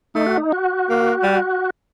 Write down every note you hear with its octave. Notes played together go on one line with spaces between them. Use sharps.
A3 D#4
F#4
D#4
F#4
A#3
G3